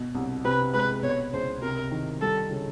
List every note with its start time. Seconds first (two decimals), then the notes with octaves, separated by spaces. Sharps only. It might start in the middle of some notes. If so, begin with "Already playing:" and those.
Already playing: B2
0.15 C2
0.45 C3 B4
0.74 G#3 B4
1.03 B2 C#5
1.33 C#2 C5
1.62 C3 A#4
1.91 D#3
2.21 G3 A4
2.51 C#3